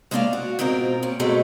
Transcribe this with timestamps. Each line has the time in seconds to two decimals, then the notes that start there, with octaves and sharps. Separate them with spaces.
0.11 G#3 A#3 C#4 D4 D5 F5
0.33 F#4
0.59 G#2 B2 C4 F4 A#4
1.03 A#2 C#4
1.19 G2 B2 F#3 G#3 A3 C4